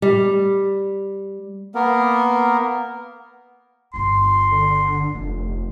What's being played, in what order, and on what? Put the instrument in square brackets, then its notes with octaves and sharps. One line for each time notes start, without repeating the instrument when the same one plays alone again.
[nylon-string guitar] G3
[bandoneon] A#3 B3 A#4
[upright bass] G1 F4 [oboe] C6
[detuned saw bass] D3
[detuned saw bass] F1 [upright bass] A3 B3